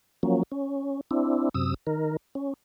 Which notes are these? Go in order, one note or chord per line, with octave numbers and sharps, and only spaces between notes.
F3 F#3 A#3 C#4
C#4
C4 D4 E4
F#2 C3 D#6 E6
D#3 A#4
C#4